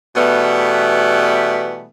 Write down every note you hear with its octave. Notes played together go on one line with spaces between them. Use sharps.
B2 E3 G3 A3 B3